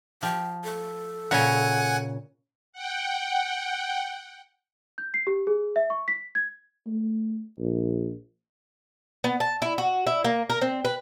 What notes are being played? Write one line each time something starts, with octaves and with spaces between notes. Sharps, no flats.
F3 G5
A4
A#2 C#3 C#5 F#5 G#5
F#5 G5
G6
C7
G4
G#4
E5
C#6
B6
G#6
A3
A#1
B3
A5
E4
F#4
E4
A#3
A#4
C4
B4